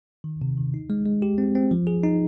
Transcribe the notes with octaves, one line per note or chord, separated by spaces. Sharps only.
D#3
C3
D#3
D#4
G#3
G#3
G4
C4
C4
F3
G#4
D#4